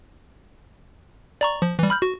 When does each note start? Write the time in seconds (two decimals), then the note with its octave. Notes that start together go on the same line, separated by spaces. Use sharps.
1.41 D5 A#5 C#6
1.62 F3
1.79 E3 G3
1.90 B5 F6 G6
2.02 F#4